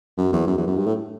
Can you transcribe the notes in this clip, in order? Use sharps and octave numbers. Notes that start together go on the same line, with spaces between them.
F#2
E2
F#2
E2
F#2
G2
A2